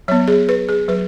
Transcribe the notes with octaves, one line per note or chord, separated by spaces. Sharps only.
F#3 B3 C#5
G#4
B4
G#4
F#3 B4